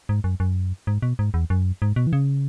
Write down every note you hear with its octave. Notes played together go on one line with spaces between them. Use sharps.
G#2
F#2
F#2
G#2
B2
G#2
E2
F#2
G#2
B2
E3
C#3